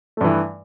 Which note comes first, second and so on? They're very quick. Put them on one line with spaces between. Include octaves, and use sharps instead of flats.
A3 G2 E3